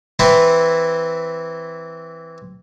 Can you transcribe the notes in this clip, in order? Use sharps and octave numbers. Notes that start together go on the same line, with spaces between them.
E3 C4 E4 C5